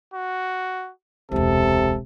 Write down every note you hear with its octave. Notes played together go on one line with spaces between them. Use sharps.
F#4
E1 C#2 C3 A4